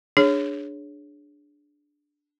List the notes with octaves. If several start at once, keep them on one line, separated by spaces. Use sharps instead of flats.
D4 G#4 C#5